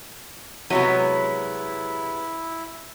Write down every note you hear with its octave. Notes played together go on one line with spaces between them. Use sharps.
C3 F#3 G#3 B3 E4 D#5